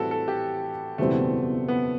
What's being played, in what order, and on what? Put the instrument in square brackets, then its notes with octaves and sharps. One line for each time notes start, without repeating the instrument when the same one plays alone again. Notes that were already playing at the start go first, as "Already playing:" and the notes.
Already playing: [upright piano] A2 E3 G3 C4 [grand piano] E4 F#4 A4
[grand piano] A4
G4
[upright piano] F#1 E2 B2 G3 C4 [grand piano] A3
[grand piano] B3